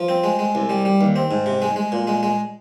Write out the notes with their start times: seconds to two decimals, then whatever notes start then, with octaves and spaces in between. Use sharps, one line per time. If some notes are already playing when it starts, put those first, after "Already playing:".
Already playing: F3
0.09 C4
0.24 G#3
0.39 G#3
0.55 C2
0.70 G3
0.85 G3
1.01 D#2
1.16 C4
1.31 G#2
1.46 C3
1.62 G#3
1.76 G#3
1.92 A#2
2.07 G#3
2.23 G#3